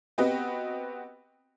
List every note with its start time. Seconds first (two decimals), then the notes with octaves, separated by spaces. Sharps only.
0.18 B3 C4 F#4 G4 B4 D#5